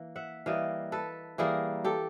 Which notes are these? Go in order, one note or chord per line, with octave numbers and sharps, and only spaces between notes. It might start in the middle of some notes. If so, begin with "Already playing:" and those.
Already playing: E3 A#3
E5 F#5
E3 G3 A#3 D#5 F5
A4 B4
E3 G3 A#3 G#4 A#4
G4 A4